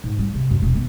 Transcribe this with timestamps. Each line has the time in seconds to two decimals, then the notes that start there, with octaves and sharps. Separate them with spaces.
0.04 G#2
0.19 F#3 G3
0.34 C3
0.51 F#2
0.62 E1
0.74 D#3 B3